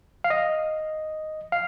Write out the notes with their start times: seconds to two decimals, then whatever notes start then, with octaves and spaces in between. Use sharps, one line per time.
0.24 F5
0.30 D#5
1.52 F5